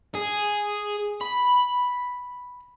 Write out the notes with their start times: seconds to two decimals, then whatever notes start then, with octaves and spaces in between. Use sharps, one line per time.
0.15 G#4
1.21 B5